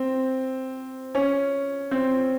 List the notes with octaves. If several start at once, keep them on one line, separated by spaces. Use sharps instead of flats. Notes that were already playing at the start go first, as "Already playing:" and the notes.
Already playing: C4
C#4
C4